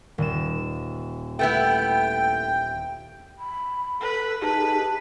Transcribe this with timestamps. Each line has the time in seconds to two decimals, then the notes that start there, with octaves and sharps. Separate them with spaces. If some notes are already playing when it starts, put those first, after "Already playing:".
0.18 D#1 E7
1.39 A3 B3 E4 G5
3.39 B5
4.01 A4 B4
4.42 D#4 G4 G#4 B4 A5